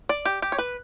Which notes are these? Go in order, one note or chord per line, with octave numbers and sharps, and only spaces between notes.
D5
G4
G4
C#5
B4